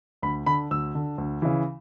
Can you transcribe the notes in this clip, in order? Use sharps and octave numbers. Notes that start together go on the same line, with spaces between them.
D2 B5
D3 B5
D2 E6
D3
D2
C#3 E3